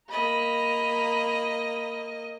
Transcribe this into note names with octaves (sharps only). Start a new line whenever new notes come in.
A#3 D#5 A#5 B5